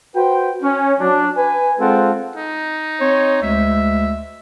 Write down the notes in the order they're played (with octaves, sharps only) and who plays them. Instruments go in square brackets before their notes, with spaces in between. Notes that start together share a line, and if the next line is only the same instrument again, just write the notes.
[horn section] F#4 B4 C5 G5
C#4
F#3 D4
B4 G#5
G#3 C4 F4 A4 F#5
[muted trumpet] D#4
[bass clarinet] C4 [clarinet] C#5
[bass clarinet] D2 [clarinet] G#3 [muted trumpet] E5